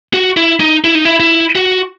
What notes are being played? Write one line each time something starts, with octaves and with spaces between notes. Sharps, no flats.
F#4
E4
D#4
E4
D#4
E4
E4
F#4